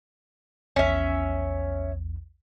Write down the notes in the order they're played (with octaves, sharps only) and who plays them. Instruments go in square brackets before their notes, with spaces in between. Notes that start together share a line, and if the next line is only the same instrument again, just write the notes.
[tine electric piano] A#1 E2 [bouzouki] C#4 E5